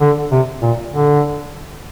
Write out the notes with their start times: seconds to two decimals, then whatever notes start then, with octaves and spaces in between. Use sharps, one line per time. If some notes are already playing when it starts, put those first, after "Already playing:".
0.01 D3
0.32 C3
0.62 A#2
0.93 D3